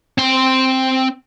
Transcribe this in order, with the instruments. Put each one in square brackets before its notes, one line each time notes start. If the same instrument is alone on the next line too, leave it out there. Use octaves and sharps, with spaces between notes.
[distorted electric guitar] C4 C6